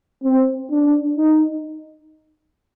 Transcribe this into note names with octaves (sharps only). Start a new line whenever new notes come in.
C4
D4
D#4